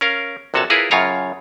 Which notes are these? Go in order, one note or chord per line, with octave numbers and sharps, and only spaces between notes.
C#4 A#4 F5
A#1 C3 F#4 A4 C#5 A5
E4 F4 G#4 A#4 B4 C#5
F#2 C#3 F4 C#5 A#5